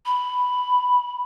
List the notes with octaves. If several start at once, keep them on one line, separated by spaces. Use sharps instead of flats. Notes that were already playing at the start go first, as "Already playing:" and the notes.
B5